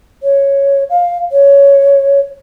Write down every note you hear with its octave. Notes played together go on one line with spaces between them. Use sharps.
C#5
F5
C#5